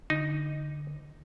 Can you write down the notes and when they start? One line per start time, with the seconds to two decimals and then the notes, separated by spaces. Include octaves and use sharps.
0.10 D3 D#4